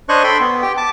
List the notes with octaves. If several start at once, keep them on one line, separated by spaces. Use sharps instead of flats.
D4 C5 C#5 D#5 C#6 F#6
A4 G5 B5 C6
B3
G4 G5
A5 D6